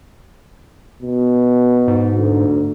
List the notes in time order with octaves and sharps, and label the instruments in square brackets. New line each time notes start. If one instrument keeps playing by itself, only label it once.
[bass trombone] B2
[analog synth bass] G#2
[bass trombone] D2